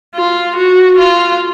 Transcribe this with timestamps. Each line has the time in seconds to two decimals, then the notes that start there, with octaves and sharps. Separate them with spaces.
0.15 F4
0.56 F#4
0.98 F4